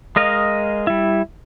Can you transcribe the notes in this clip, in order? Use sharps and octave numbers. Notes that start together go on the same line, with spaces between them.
G#3 A#4 D#5 F5
G3 E4